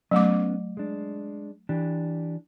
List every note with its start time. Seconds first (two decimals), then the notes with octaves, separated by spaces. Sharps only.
0.11 F#3 A3 B3 C#4 D6
0.77 G#3 D4
1.69 E3 D4 G4